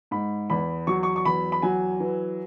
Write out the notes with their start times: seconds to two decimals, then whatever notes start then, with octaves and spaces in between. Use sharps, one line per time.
0.11 G#2 B5
0.50 E2 B5
0.87 F#3 C#6
1.03 C#6
1.16 C#6
1.25 E2 B5
1.52 B5
1.62 F#3 G#5
2.00 E3